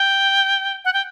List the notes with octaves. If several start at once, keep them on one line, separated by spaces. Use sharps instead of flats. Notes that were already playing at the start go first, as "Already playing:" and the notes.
Already playing: G5
F#5
G5